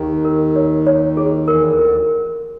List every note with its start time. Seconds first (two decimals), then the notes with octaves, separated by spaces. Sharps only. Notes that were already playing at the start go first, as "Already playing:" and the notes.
Already playing: D#2 D#3 G4
0.25 A#4
0.56 C#5
0.87 C#5
1.17 G#4
1.48 E2 E3 A#4
1.71 D2 D3
1.79 A#4